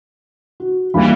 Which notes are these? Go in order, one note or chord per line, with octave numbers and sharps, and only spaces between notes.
F#4
D#2 E3 G3 F5 B5